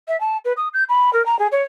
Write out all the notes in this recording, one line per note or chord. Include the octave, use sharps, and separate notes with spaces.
E5
A5
B4
D#6
G6
B5
A#4
A#5
G#4
C#5